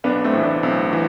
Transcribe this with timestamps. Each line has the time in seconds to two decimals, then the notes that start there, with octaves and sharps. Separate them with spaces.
0.04 B1 B3 D4
0.24 A3 C4
0.33 A2 E3 E4
0.43 B3 D4
0.63 B1 C4 E4
0.93 E3